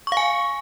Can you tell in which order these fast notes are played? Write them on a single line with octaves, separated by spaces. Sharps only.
C#6 F5 G#5